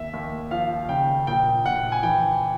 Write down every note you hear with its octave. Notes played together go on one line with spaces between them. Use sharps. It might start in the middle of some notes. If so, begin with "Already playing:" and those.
Already playing: D#2 E5
D#2
F3 F5
C#3 G5
A#1 G5
A#1 F#5
G#5
E3 G5